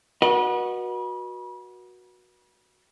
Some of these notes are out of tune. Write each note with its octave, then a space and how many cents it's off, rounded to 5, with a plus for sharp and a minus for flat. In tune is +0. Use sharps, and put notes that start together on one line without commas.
F#4 -10 B4 -35 D#5 -30